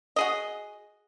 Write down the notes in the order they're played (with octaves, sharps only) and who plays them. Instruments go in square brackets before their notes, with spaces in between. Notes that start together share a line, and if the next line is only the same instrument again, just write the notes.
[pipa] F#4 G#4 D#5